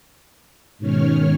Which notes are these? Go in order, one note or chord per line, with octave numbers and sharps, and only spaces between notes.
G#2 B2 D#3 C#4 C#5 F6